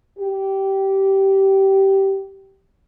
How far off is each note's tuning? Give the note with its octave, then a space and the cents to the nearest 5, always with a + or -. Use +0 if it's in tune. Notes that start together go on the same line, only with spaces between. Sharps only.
G4 -15